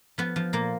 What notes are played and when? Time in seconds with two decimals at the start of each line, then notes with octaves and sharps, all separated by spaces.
0.18 F3 B3
0.36 F3
0.53 A#2 A#3